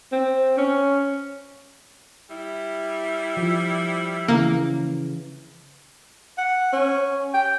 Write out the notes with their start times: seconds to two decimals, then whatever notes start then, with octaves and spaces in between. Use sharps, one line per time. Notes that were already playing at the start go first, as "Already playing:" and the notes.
0.12 C4
0.58 C#4
2.29 G3 E4
3.37 F3
4.28 C#3 E3 A#3
6.38 F#5
6.73 C#4
7.34 G5